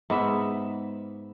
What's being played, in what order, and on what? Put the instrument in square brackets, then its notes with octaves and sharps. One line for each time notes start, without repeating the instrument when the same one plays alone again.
[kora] G#2 B3 E5